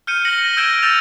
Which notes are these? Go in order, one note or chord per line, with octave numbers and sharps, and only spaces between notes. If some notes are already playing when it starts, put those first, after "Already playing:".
F6 G6 C#7 D#7
A#6 C#7 F#7 G7
A#6
E6 G6 G#6 D7 E7
E6 G6 A6 E7 F7